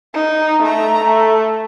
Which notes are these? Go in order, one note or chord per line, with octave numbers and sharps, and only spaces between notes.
D#4
A3 A#5
A3